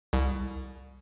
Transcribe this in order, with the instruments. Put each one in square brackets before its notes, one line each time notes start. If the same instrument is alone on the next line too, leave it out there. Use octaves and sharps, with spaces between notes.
[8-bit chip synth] C2